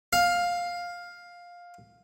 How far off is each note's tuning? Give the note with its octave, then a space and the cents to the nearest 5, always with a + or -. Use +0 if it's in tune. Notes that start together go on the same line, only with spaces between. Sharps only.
F5 +10